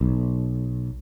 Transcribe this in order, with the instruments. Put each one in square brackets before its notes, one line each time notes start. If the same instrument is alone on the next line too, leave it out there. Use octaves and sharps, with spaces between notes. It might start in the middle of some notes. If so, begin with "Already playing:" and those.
[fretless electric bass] B1